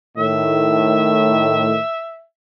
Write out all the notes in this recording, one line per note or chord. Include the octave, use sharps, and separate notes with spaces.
A2 D#3 E5